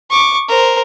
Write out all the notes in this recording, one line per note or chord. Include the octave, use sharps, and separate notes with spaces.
C#6 D6
A#4 C5